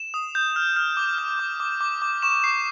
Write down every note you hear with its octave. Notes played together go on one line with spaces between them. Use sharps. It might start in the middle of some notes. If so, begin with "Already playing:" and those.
Already playing: E7
D#6
G6
F6
F6
D6
F6
D6
D6
D6
D6
C#6 E7
C#6 C7